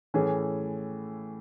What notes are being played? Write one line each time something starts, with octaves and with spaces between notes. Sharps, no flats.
A2 E3 A3 C#4 G#4